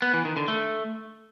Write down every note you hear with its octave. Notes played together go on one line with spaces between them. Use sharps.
B3
E3
D#3
D3
A3